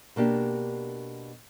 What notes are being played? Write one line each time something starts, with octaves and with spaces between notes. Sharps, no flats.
B2 A#3 D4 G4